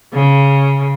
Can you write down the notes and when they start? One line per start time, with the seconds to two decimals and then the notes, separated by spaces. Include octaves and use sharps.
0.13 C#3